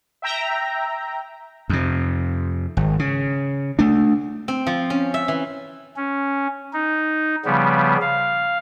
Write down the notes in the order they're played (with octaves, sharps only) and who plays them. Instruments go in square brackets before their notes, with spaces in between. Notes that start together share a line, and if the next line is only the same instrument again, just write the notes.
[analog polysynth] E5 G5 A#5
[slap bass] F2 C3
G#1
C#3
A3 D4
[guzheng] C4
F3
C#4
E5
E3
[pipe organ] C#4
D#4
C#3 F3 G3 B3
F5